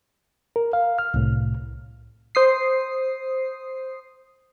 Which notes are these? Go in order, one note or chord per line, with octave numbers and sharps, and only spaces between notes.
A#4
F5
F6
C2 A2
C5 D#6 C7